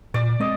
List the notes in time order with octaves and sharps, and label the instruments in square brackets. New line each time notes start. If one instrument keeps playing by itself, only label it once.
[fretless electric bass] A#2 [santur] D5
[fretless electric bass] G#3 C4 [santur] D#5